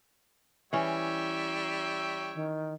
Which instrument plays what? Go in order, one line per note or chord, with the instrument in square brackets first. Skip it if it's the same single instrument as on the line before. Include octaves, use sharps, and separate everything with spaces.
[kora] E3 C#4 [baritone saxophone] G3 [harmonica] C#5 E5 G5
[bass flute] D#3